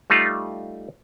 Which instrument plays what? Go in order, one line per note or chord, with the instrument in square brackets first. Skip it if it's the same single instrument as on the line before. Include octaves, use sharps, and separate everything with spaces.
[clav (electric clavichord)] G3 A3 D#4 F4